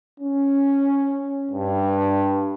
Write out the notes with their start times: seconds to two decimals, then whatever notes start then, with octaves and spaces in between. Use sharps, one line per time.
0.20 C#4
1.51 G2